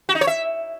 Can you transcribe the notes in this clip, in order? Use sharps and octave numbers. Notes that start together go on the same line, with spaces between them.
F#4
D#4
C#5
E5